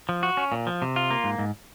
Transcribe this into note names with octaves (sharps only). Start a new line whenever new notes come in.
F3
F#4
C#4
A#2
F3
C3
F4
A#3
G#2
G#2